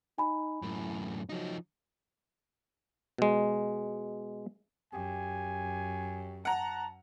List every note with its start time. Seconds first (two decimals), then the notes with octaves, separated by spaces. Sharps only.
0.18 D#4 G#5 B5
0.62 F#2 A2 E4
1.29 F3 F#3 D#4
3.18 B2 G#3
4.93 F#2 G4 G#5
6.45 F#5 A5 A#5